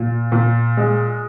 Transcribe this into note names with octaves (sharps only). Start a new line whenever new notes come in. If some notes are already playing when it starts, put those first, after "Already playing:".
Already playing: A#2
A#2
G#3